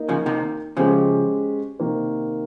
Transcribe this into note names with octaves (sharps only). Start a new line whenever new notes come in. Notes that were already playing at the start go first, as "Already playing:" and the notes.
Already playing: A#3 D#4 A#4
C#3 F3
C3 D#3
C#3 F3 G#3 C#4 G4 C5
C3 D#3 A#3